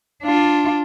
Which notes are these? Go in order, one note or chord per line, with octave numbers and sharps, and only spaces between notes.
D4 F4